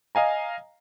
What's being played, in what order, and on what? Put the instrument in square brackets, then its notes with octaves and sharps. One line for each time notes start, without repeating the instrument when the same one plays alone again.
[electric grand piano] D#5 F5 G#5 A#5